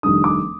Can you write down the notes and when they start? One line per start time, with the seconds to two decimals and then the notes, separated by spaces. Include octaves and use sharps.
0.03 F1 F2 D#3 G3 D4 D#6
0.24 D6